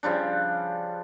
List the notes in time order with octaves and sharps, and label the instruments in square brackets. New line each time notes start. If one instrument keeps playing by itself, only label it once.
[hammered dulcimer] C#3 F3 G3 D4